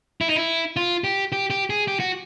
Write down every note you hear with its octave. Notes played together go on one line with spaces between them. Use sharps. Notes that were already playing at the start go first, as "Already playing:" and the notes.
E4
D#4
E4
F4
G4
G4
G4
G#4
G4
F#4